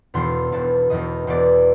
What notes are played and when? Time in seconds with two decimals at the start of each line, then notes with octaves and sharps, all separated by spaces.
0.14 E1 E2 B2 C6
0.52 E1 E2 B2 A5
0.90 E1 E2 B2 D#5
1.27 E1 E2 B2 D5